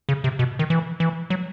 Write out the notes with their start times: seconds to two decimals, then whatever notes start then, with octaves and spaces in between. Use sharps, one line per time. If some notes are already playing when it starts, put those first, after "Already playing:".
0.09 C#3
0.24 C3
0.39 B2
0.59 D#3
0.70 E3
1.00 E3
1.30 F#3